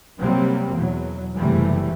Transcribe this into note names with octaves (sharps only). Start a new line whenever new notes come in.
C3 F#3 G3 A#3 C4
E2 B2 F#3
F#1 C3 E3 G3 A3